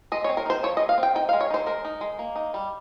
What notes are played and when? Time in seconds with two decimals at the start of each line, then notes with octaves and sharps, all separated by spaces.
0.12 G#3 D#5
0.24 C#5
0.29 C4
0.37 A#4
0.46 D#4 C5
0.63 F3 C#5
0.77 D#5
0.80 G#3
0.89 F5
0.98 C4
1.03 G5
1.15 D#4 G5
1.29 F5
1.33 G#3
1.41 C#5
1.50 D#4 C5
1.66 G#3 A#4
1.85 D#4
2.01 G#3
2.19 A#3
2.36 D#4
2.54 G3